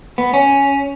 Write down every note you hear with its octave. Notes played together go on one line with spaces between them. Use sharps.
B3
C#4